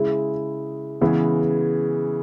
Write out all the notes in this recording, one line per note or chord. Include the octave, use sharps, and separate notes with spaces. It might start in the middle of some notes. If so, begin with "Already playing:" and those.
Already playing: C#3 G#3 E4
C#3 E3 G#3 B3